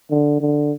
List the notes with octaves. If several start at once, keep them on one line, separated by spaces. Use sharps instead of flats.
D3
D3